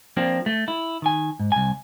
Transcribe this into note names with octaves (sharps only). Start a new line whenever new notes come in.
F3 A#3 C4 D4
A3
E4
D#3 G#5
G#2
C2 G#5